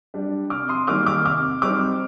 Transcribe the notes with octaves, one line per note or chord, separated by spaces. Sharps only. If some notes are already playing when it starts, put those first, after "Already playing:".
G3 D4
C3 D6 F6
C6 D#6
D#3 G3 A#3 D#4 D6 F6
D6 F6
C3 D6 F6
G3 C4 D#4 D6 F6